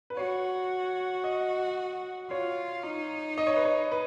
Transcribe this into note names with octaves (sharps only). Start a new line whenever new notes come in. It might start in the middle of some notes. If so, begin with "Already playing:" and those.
B4
F#4 C#5
D#5
F4 C#5
D#4
D#5
C#5
B4
C#5
B4